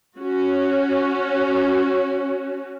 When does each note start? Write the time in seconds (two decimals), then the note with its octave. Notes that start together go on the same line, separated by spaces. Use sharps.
0.19 C#4 F#4